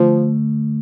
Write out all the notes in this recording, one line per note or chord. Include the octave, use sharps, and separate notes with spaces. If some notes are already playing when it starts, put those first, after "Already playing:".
Already playing: D3 F3 A3